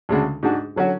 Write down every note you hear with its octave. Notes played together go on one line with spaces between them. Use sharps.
D2 C#3 G#3 D4 F#4
G#2 G#3 D4 F#4
D3 F#3 C#4 F#4